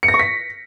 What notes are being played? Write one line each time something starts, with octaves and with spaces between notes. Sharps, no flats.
C#7
A#6
C#6
B6